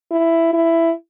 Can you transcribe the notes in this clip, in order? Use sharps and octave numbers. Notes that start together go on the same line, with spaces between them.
E4
E4